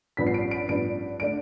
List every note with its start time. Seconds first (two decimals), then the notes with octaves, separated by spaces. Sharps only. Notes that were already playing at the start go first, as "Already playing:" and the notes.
0.17 A1 G2 F3 B3 D4 B6
0.27 C7
0.34 D7
0.51 D7
0.69 A1 G2 F3 B3 D4 D7
1.20 D3 A3 D4 D7